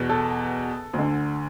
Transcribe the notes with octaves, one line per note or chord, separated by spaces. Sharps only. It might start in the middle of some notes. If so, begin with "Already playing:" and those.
Already playing: E2 B2
A4
D2
D3